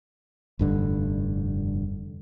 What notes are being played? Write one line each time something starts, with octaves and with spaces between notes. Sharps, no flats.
F1 G2 D3